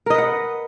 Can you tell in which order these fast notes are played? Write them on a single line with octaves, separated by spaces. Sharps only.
A#4 D#5 B4 F#5